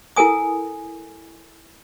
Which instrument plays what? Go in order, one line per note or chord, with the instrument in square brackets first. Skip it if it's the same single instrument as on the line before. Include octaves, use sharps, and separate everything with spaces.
[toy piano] E4 A4 A#4 G#5 D#6